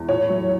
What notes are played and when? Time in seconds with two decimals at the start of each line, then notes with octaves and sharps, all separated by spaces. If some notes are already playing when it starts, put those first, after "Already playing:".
Already playing: E2
0.09 A2 C#5
0.29 F#3